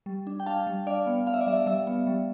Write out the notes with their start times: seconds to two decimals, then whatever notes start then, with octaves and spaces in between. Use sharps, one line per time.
0.06 G3
0.27 D4
0.40 G5
0.46 D4 F5 A5
0.67 G3
0.87 D4 D5 F5
1.07 B3
1.26 B3 F5
1.34 E5
1.41 D5
1.47 G3 E5
1.66 G3 E5
1.87 B3
2.07 G3